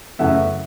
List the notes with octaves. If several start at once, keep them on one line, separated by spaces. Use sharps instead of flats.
F#2 C#3 E3 A3 E5 F#5